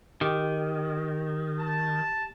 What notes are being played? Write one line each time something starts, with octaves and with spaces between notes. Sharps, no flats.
D#3 G4
A5